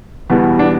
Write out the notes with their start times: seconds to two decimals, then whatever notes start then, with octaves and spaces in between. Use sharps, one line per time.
0.30 E2 B2 G3 B3
0.59 D4